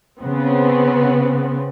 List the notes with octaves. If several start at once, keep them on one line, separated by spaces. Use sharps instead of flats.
C#3 B3 C4